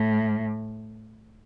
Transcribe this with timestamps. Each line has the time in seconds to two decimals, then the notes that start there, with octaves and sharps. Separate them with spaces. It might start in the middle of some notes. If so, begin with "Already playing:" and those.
Already playing: A2